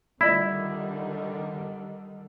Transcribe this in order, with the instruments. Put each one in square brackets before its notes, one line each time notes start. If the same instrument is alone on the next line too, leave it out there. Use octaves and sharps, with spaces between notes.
[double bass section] D3 D#3 G3 [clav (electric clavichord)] E4 [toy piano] F4 D5 D#5